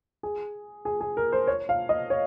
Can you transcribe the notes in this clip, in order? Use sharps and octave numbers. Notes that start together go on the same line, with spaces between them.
G#4
G#4
G#4
A#4
C5
C#5
F5
D#5
C#5